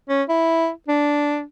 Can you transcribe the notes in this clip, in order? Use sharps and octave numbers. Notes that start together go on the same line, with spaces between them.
C#4
E4
D4